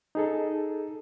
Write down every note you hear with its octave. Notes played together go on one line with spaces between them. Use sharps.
D#4 G#4 A4